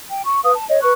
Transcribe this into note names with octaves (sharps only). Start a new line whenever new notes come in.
G5
C#6
B4 F5 D#6
A5
C#5 D#5
B4 C#6 F#6